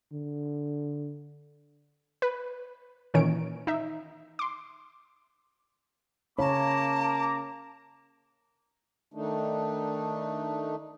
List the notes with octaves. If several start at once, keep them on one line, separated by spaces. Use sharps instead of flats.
D3
B4
A#2 D#3 E3 C#4 C#5 D7
D#4 E5
C6 D6
C#3 A#3 C#5 A5 A#5 D6
D#3 A3 D4 D#4